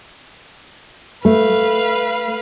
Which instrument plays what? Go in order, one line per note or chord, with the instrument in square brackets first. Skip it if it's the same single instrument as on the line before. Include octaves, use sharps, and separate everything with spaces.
[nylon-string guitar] A3 [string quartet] B4 F5